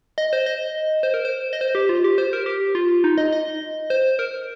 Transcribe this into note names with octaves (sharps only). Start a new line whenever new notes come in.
D#5
C5
D#5
C5
A#4
C5
D#5
C5
G4
F4
G4
C5
A#4
G4
F4
D#4
D#5
D#5
C5
A#4